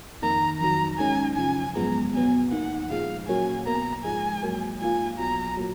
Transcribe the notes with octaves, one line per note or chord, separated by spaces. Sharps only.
F2 D#3 A#3 D#4 A#5
F2 D#3 F#3 A#5
D#2 D#3 G#3 C#4 G#5
F#2 C#3 F3 G#5
G#1 F#2 F3 G#3 B3 A#5
B2 F#3 B3 G#5
D#2 D#3 A#3 F#5
A#2 F3 G#3 F5
A#2 F#3 A#3 C#4 F#4 G#5
B1 B2 A#3 A#5
G#2 F3 G#3 G#5
G#2 F#3 A#3
G#2 F3 A#3 F4 G#5
B1 B2 F#3 A#5
A#2 F#3